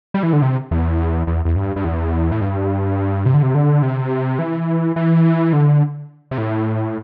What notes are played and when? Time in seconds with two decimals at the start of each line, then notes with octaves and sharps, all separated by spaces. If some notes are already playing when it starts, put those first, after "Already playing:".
0.14 G3
0.23 E3
0.33 D3
0.42 C3
0.71 E2
1.27 E2
1.45 E2
1.56 G2
1.76 G2
1.84 E2
2.32 A2
2.41 G2
3.26 C3
3.34 D3
3.43 C3
3.55 D3
3.82 C3
4.39 E3
4.96 E3
5.53 D3
6.31 C3
6.38 A2